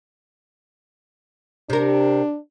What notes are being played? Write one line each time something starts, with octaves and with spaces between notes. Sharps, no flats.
C3 D4 A#4